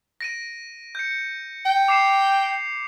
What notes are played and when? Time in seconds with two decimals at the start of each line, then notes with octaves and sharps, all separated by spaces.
0.21 A#6 D7 D#7
0.95 G6 C#7
1.66 G5
1.88 D6 C7 E7